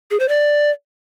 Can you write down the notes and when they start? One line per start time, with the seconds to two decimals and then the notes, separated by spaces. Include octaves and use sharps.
0.11 G#4
0.20 C5
0.29 D5